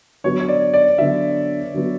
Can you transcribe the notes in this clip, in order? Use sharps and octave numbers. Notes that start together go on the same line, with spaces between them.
D3 F#3 B3 F#4 C#5
C#5
D5
D5
D3 F#3 B3 F#4 E5
D3 F#3 B3 F#4